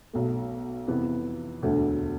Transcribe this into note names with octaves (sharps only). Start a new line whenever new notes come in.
B1 B2 A3
F2 C3 E3 B3
E1 D2 D3 A3